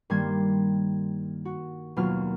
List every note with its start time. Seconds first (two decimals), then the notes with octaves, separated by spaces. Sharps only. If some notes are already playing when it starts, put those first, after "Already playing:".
0.10 G2 D#3 G3 A#3 C6 G#6
1.45 F#4
1.96 D#2 B2 F#3 A#3 F4 F6